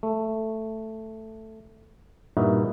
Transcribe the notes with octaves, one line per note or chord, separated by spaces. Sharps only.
A3
G2 A#2 D#4 E4 F#4 E5